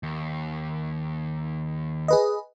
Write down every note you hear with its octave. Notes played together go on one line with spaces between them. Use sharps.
D#2
G#4 B4 D#5